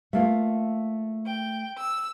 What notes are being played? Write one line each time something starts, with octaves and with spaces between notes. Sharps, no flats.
A3 A#3 F4
G5
E6